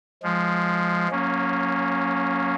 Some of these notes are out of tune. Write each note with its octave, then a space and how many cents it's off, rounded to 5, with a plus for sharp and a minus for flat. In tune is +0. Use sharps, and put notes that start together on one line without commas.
F3 +0 G#3 +0
F#3 -35 A#3 +0 C#4 +0